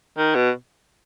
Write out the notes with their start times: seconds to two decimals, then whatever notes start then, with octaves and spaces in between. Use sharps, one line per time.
0.18 D#3
0.35 B2